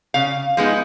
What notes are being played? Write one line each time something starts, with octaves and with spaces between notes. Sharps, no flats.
C#3 F5
F3 G#3 B3 D#4